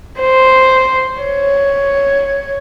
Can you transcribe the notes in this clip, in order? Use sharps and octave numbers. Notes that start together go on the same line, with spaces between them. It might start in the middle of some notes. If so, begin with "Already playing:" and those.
C5
C#5